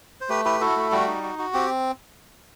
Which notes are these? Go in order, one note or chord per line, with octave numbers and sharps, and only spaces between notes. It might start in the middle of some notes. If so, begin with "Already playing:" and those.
C5
A3 G4 B4
E4 G4 B4
E4 F#4 A4
A3
G3 F#4
D#4
F#4
F#4
C4 G4